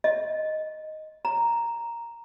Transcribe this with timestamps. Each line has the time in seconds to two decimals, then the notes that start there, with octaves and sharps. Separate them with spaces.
0.04 D#5
1.25 A#5